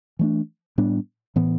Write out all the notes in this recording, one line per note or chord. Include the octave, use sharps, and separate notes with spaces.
E3 A3 D4
A2 G3 B3 D4
A2 E3 B3